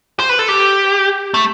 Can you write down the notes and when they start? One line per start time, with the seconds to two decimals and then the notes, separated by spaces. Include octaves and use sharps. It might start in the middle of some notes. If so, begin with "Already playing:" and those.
0.20 C5
0.29 B4
0.39 A4
0.48 G4
1.34 A3